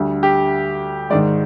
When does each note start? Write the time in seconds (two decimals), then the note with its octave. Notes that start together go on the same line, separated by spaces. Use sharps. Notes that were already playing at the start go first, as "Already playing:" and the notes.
Already playing: D2 D3 G3
0.23 G4
1.10 G#2 D#3 G#3 D5